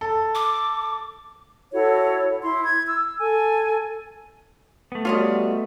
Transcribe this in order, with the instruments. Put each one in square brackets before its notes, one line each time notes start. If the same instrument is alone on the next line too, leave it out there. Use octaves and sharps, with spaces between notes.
[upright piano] A4
[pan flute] D6
[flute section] E4 F#4 A4 C#5
E4 C6
G#6
E6
A4 G#5
[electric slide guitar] A3 B3
[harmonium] G3 [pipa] F4 C#5 D#5 [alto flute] F#4